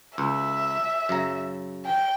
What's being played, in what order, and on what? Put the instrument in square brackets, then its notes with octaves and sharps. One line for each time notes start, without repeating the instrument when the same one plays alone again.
[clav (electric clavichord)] C#2 [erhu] E5
[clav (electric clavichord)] F#2 C#3 A#5
[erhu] G5